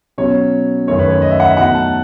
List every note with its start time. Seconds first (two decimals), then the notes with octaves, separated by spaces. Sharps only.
0.18 B2 F#3 C#4 C#5
0.87 F#2 D#3 A3 C#5
0.99 B4
1.10 C#5
1.22 D#5
1.30 E5
1.40 F#5
1.48 E5
1.56 B2 F#3 A3 D#4 F#5
1.75 A5